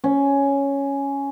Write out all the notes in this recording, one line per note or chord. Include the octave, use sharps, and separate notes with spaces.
C#4